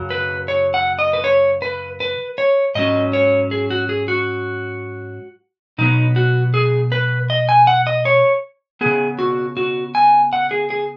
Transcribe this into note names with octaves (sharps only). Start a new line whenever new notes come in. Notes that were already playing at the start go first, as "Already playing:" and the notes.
Already playing: F#2 C#3 F#3
B4
C#5
F#5
D#5
B4
C#5
B4
B4
C#5
G#2 F#3 C#4 D#5
C#5
G#4
F#4
G#4
F#4
B2 F#3 B3 D#4
F#4
G#4
B4
D#5
G#5
F#5
D#5
C#5
C#3 B3 G#4
F#4
F#4
G#5
F#5
G#4
G#4